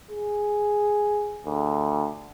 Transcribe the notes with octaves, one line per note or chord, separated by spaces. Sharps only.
G#4
D2